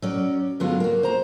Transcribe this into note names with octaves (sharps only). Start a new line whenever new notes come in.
F#3 C#4 D5
G2 D3 F#3 G#3 B3 F4
A#3 F#4
C5 A#5